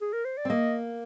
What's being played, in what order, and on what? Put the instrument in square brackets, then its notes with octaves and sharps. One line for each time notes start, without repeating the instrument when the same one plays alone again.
[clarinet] G#4
A#4
C5
D5
[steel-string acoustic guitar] C4
[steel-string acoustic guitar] A#3 [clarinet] D#5